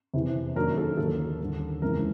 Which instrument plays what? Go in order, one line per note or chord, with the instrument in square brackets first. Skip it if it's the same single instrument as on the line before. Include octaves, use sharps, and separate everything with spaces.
[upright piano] F1 E2 C3 E3
F#2 D#3 F#3 A#3 D4 A#4
A4
D#2 D3 F3 A#3 A4
D#2 D3 G3
F2 C#3 E3 G#3 A#4